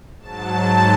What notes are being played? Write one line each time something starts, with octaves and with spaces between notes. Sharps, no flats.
G#2 F#3 A5